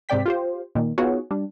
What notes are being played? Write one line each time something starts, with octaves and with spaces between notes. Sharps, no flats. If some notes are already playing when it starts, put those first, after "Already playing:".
G#2 C3 C4 D5 G5 B6
F4 G4 C5
A#2 D#3
B3 D#4 F4 F#4 G#4 C#5
G3 D4